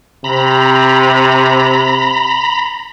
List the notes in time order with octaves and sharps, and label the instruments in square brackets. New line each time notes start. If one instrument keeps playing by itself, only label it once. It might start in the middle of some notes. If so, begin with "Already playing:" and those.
[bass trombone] C3 [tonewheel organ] A#5 B5